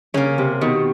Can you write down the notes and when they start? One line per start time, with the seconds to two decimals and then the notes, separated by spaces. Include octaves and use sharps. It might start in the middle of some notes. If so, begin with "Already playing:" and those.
0.14 C#3 A#3 C#4
0.38 C3
0.61 B2 D#3